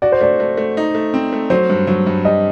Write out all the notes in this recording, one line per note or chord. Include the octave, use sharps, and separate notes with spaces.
F#4 D5
C5
A3 D5
A3
A3
D#4
A3
C4
A3
F#3 C5
G2
F#3
G2
G3 D#5